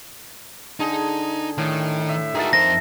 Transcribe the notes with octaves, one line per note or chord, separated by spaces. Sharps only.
D3 D#4 G#4
A2 D#3
E5
D#3 F#4 G#4 E5 A5
F2 C5 A#6